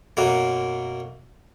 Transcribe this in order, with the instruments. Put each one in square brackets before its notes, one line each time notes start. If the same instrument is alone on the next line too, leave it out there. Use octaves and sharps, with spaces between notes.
[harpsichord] F#2 B2 A#3